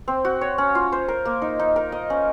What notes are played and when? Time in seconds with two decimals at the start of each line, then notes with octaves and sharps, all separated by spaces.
0.08 C4
0.25 F#4
0.41 C#5
0.58 C#4
0.75 F4
0.92 C5
1.08 A#4
1.25 A#3
1.42 D#4
1.60 D#4
1.76 A#4
1.92 D#5
2.10 C#4